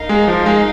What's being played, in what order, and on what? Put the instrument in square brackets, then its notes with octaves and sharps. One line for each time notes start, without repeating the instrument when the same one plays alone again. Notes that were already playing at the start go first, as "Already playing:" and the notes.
Already playing: [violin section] D#4 A#4 F5
[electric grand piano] G#3
F3
G#3